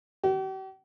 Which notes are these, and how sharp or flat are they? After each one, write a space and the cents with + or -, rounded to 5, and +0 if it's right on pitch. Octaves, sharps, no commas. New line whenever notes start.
G4 -45